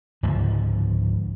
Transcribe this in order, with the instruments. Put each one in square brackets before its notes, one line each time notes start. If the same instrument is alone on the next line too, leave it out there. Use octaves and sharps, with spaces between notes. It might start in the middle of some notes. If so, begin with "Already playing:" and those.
[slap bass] C#2 G#2 D3 F3